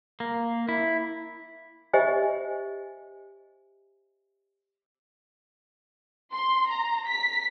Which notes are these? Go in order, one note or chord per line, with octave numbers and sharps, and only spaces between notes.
A#3
E4
G4 C5 D#5 E5 G#5
C6
A#5
B6